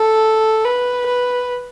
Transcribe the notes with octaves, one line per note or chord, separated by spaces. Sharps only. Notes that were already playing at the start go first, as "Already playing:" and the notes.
Already playing: A4
B4
B4